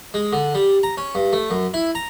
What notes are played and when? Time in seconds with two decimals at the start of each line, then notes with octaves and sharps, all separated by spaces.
0.14 G#3
0.33 D3
0.54 G3
0.83 A#5
0.97 C#4
1.15 G2
1.33 A3
1.50 F#2
1.74 E4
1.95 A#5